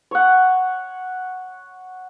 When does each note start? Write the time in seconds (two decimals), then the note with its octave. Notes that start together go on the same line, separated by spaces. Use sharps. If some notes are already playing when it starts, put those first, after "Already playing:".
0.11 C#5 F#5